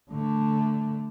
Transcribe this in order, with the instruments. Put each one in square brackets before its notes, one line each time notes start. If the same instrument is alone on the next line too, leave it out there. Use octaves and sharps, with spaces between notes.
[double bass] D3 A3